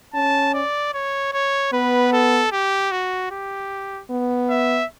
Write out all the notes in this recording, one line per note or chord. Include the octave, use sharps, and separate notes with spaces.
C#4 A5
D5
C#5
C#5
B3 B4
A4
G4
F#4
G4
B3
E5